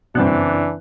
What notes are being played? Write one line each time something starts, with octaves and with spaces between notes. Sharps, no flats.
F#1 G2 B2 E3 C4 D4 F#6